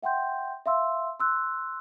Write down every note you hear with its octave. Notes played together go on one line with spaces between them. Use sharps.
E5 F#5 G5 C6 G6
E5 F5 C6 E6
C6 E6 F#6